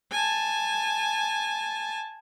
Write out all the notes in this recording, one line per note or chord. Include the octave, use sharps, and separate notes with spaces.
G#5 A5